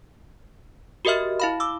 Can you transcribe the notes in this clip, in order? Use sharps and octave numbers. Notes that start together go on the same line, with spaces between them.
F#4 G4 A#4 D#5 E5 F6
E4 F5 B5
D6 E6